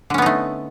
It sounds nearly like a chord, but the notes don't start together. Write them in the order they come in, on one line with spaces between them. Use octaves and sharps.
D3 C#4 B3 D#4 A3